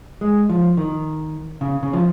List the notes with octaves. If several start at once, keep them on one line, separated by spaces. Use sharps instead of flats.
G#3
F3
D#3
C#3
C#3
F3